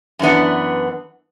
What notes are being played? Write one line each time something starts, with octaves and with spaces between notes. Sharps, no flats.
F#2 E3 B3 D4